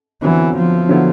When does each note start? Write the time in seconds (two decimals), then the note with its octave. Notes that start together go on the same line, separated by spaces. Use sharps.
0.22 F2 D3 E3 F#3 B3 E4
0.56 F3
0.89 D3 F#3 B3 E4